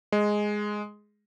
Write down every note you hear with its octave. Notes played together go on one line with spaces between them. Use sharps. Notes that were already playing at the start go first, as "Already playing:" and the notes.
G#3